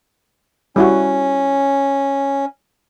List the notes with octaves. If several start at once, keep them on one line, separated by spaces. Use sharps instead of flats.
G3 C#4 E4 F#4